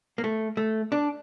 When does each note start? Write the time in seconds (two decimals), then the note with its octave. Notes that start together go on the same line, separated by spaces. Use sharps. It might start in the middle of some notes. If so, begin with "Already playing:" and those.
0.18 A#3
0.24 A3
0.57 A3
0.92 D4